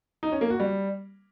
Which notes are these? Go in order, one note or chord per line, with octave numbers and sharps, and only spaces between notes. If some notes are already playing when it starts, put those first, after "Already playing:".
D#4
C#4
A#3
F#4
G3